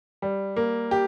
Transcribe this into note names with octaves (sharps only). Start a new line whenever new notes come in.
G3
A#3
G4